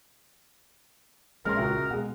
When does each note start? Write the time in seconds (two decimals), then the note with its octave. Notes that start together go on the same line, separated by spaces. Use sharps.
1.45 A#1 G#3 C#4 A#4 C6 F6
1.57 C#2 F#4 E5
1.91 B2 G#3 F#5